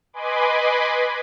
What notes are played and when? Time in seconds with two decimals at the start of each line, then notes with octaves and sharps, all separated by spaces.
0.13 B4 D#5 G#5 B5 C6 D6